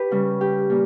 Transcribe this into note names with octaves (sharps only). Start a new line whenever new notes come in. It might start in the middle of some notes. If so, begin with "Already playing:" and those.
Already playing: G4 B4
C#3 G3
G4
A#2 G3